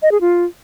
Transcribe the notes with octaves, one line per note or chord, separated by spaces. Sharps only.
D#5
G#4
F4